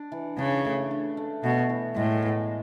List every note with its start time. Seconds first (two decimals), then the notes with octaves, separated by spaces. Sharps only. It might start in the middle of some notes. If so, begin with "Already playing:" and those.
Already playing: D4
0.12 E3
0.38 C#3 D4
0.65 A3
0.91 D4
1.17 A3
1.43 B2 A3
1.69 E3
1.96 A2 G#3
2.22 B3